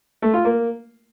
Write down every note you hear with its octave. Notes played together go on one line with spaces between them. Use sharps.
A3
F4
A#3